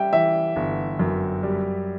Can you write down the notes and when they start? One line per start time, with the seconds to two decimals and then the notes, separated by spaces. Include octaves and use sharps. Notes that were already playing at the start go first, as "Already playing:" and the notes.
Already playing: G3 E5 G5
0.13 E3 E5
0.56 G1
0.99 F#2
1.43 G3